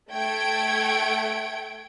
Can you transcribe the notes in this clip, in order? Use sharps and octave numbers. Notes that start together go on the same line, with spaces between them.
A3 G5 G#6 D7